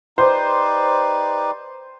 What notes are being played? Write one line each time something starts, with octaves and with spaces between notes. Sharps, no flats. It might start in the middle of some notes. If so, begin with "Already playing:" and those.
D#4 G4 B4 C5 D5